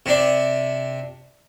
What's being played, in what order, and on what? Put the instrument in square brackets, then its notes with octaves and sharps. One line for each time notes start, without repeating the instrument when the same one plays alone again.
[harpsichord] C3 D4